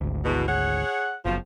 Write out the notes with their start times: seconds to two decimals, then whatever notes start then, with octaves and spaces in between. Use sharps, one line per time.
0.01 G#1 D2
0.25 E2 B2
0.47 G#4 C#5 F#5
1.25 F#1 B2 F3